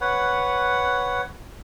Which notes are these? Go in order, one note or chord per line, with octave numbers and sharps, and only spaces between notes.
B4 C#5 F#5